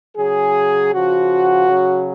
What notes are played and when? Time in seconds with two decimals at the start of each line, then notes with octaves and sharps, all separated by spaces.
0.16 C#3 F#3 G#4
0.92 C#3 F3 F#4
1.67 C#3 F#3